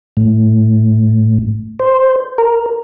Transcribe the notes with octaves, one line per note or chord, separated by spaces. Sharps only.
A2
C5
A#4